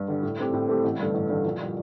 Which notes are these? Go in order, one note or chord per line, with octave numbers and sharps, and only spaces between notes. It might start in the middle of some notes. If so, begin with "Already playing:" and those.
Already playing: G2
D3 G3 D4
A2
A3 C4 G4
A2
A3 C4 G4
A1
G2 D3 A3
A1
G2 D3 A3
A#1
A#2 G3